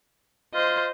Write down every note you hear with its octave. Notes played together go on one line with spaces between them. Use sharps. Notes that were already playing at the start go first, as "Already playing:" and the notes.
F4 C5 D#5